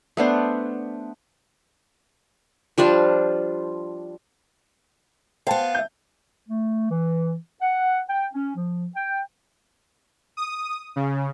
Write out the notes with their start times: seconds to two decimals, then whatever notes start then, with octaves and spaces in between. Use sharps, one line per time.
0.17 A3 B3 D4 C5
2.78 F3 G3 D4 F4
5.47 B3 C5 F5 G5 A5
5.75 E5 G6
6.48 A3
6.91 E3
7.62 F#5
8.09 G5
8.34 C#4
8.56 F3
8.96 G5
10.37 D#6
10.96 C#3